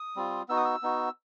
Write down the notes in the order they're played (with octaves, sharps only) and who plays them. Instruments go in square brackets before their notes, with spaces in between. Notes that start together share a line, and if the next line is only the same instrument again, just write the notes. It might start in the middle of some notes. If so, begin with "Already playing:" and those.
Already playing: [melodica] D#6
G3 C4 F4
B3 D#4 F#4 E6
D#6
E6
B3 D#4 F#4